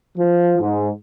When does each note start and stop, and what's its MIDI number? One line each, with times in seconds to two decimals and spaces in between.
0.18 0.59 53
0.60 0.90 44